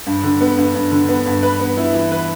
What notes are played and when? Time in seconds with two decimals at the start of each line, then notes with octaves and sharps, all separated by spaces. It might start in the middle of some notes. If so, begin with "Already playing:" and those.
0.07 G2
0.23 D3
0.41 B3
0.58 G2
0.75 G2
0.92 D3
1.09 B3
1.26 G2
1.43 B4
1.60 B3
1.77 E4
1.94 E3
2.12 B4